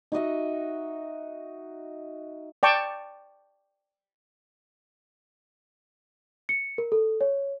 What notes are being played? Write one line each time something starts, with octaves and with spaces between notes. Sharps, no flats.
D#4 F#4 D#5 E5
D5 G5 A5 C#6
C#7
A#4
A4
C#5